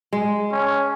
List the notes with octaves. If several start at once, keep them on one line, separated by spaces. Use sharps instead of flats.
G#3
C#4